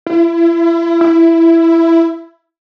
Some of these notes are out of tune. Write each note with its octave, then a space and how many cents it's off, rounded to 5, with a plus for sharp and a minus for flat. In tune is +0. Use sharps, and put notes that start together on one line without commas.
E4 +35
E4 +10